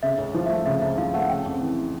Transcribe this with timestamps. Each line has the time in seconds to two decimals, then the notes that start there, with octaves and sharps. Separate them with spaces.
0.03 C#3 E5
0.18 C#2
0.34 F3
0.46 A3 E5
0.66 C#3 E5
0.82 C#2 E5
0.97 F3 F5
1.14 A3 F#5
1.29 C#3 G5
1.46 F2
1.61 E3